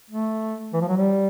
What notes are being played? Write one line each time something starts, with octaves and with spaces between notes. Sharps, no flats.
A3
E3
F3
F#3
G3